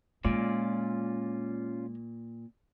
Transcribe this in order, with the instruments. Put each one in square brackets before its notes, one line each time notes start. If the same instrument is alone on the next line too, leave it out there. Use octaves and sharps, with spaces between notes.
[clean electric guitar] A#2 [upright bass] G#3 [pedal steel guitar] C#4 F4 D5